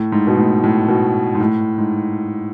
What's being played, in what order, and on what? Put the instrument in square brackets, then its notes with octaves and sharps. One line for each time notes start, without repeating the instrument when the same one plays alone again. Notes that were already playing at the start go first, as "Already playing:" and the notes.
Already playing: [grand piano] A2
G#2
B2
A2
A2
B2
G#2
A2
G#2